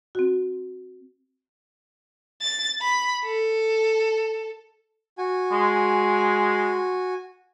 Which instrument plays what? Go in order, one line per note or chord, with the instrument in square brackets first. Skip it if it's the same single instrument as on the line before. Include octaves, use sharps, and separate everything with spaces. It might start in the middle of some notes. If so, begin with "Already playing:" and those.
[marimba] C4 F#4
[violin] A6
B5
A4
[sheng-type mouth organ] F#4 G#5
[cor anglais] G#3